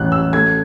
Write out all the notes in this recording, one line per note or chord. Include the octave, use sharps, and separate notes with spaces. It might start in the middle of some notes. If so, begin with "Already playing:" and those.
Already playing: A1 F#6
E6
A3 G#6